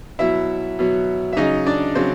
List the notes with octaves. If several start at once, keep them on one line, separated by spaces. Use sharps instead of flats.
B2 F#3 E4 E5
B2 F#3
E5
C#3 F#3 D#4 D#5
D4 D5
C#3 F#3 C4 C5